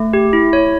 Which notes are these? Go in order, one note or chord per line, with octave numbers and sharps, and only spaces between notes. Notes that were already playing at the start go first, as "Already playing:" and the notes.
Already playing: A3
G4
E4
C#5